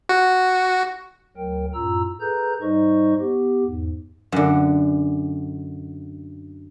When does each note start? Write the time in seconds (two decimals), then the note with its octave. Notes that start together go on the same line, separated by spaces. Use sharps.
0.09 F#4
1.37 D2 F#3 A#4 G5
1.74 F#2 A2 F4 A#5 E6
2.21 G#4 A4 B4 A#5 G6
2.62 G#2 G3 D#4 C5 D#5 C#6
3.20 B3 G4
3.65 E2 G#2
4.32 F#2 D3